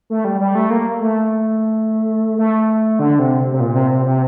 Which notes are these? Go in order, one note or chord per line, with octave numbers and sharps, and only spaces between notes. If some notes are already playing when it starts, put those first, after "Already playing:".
A3
G3
G3
A3
A#3
A3
A3
D3
C3
C3
A#2
C3
C3
C3